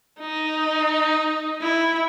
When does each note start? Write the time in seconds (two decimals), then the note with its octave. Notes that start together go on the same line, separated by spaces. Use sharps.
0.20 D#4
1.61 E4